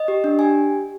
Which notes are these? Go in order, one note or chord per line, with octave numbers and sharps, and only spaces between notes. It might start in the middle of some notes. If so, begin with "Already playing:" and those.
Already playing: D#5
G4
D4
G4 G#5